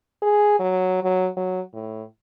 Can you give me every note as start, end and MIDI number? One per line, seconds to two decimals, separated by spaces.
0.22 0.58 68
0.59 1.03 54
1.03 1.29 54
1.37 1.61 54
1.73 2.03 45